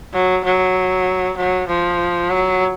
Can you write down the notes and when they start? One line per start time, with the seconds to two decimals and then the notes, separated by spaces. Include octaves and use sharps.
0.13 F#3
0.44 F#3
1.37 F#3
1.67 F3
2.30 F#3